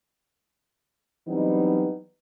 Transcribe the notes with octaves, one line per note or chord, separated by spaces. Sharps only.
E3 F#3 G3 B3 C4 D#4